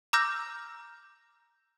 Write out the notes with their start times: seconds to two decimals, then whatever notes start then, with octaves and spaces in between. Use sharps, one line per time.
0.13 A#5 D6 E6 F6 G6 A#6